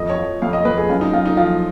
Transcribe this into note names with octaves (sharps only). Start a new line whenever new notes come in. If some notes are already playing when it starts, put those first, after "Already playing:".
Already playing: F2 D#5
C#5
F3
F2 F5
D#5
F2 B4
G#4
F#2 F4
D#4
F#2 F4
D#4
F3 F4